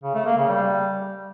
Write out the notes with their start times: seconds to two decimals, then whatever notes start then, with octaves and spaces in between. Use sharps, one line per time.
0.03 C#3
0.14 A3
0.26 A#3
0.37 C#3
0.48 G3